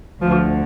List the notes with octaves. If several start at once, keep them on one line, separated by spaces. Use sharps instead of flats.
D2 D3 F3